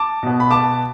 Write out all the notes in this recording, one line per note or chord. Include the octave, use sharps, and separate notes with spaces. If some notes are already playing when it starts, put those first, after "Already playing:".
Already playing: A5 D6
B2 B3
B5
A5 D6